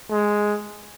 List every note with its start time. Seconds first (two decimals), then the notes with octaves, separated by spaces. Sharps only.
0.10 G#3